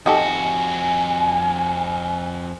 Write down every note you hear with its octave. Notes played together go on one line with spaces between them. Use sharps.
F2 D#4 F#4 G4 A4 G#5